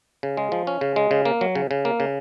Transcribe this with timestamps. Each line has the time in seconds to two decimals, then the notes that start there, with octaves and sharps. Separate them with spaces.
0.23 C#3
0.37 G#3
0.52 F3
0.67 C#4
0.81 C#3
0.96 G#3
1.11 C#3
1.25 A#3
1.41 F#3
1.55 C#3
1.71 C#3
1.85 A#3
2.00 C#3